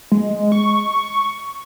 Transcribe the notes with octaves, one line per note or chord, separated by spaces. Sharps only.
G#3
C#6